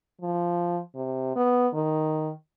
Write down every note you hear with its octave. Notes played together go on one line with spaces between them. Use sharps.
F3
C3
B3
D#3